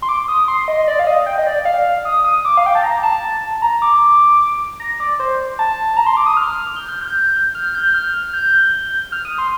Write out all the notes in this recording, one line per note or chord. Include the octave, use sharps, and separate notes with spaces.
C6
D6
D#6
C6
D#5
D#5
D5
F5
D#5
G5
D#5
D5
F5
D#6
D#6
D6
F5
G5
A5
A#5
A5
A#5
D6
A#5
D5
C5
A5
A#5
C6
D6
D#6
F6
G6
F6
G6
F6
G6
F6
G6
F6
D#6
C6